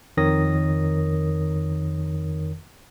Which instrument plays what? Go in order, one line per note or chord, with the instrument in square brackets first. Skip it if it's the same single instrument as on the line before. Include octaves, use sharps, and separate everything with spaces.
[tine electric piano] F2 D#3 A#4 C#5 D#6 A#6